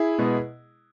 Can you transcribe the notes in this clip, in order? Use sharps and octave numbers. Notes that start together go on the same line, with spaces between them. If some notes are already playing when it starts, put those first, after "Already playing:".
Already playing: E4 G#4
B2 G#3 B3